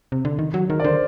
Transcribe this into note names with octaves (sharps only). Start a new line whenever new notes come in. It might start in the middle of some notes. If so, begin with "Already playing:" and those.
C3
D3
D#3
F#3
D#3 A#4
D5
D3 C5